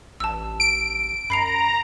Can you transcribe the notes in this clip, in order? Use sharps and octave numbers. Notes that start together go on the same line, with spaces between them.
A1 A5 E6
D7
F#2 A#5 B5 C7 F7